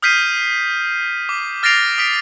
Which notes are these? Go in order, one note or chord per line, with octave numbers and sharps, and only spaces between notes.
D#6 F6 G6 B6 C7 D#7
D6
F6 A6 A#6 C7 D7 F7
D#6 B6 D7